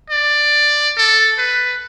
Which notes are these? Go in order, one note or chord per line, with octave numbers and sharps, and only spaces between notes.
D5
A4
B4